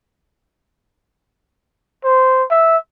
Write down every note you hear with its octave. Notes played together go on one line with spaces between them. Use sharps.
C5
E5